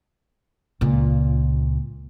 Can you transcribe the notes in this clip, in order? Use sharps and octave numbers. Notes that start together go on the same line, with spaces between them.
C#2 A#2